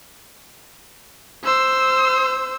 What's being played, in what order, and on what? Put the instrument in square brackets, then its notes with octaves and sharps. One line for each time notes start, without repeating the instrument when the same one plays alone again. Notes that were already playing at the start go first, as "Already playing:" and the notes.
[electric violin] C5 E6